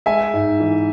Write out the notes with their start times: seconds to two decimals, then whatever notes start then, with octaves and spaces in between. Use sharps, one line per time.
0.06 G#3 E5 G#5
0.33 G#2
0.60 E3